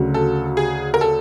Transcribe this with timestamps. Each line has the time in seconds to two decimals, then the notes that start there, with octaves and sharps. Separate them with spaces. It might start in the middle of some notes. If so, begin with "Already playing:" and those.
Already playing: D2 C#3 F#3
0.14 A4
0.57 G#4
0.94 A#4
1.01 A4